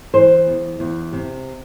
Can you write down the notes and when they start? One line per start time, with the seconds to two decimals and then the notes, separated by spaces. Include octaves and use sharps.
0.14 E3 C5
0.46 E2
0.80 E2
1.12 C3